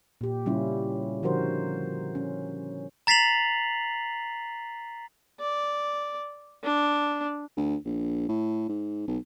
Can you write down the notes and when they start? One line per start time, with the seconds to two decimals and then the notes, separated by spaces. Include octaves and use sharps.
0.21 A#2 G4
0.46 C#3 G3 C#4 E4 F4
1.23 D3 F3 F#4 A#4 C5
2.15 C#4
3.07 A#5 A6 B6 C7 F7 F#7
5.40 D5
6.64 D4
7.57 D2
7.85 A#1
8.29 A2
8.69 G#2
9.08 B1